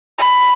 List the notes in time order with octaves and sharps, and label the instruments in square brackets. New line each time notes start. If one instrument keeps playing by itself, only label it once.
[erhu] B5